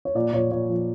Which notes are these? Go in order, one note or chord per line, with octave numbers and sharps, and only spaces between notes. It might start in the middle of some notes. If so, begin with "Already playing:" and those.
C#5
A#2 D5
A#2 C#5
A#2 C#5
F3